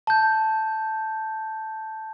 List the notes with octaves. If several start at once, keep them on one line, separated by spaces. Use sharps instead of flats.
A5 G6